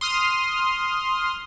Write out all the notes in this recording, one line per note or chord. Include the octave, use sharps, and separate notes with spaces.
C6 D#6 F6